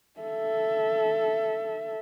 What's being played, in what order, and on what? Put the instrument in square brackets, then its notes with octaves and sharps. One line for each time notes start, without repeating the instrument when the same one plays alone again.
[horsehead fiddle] A4 E5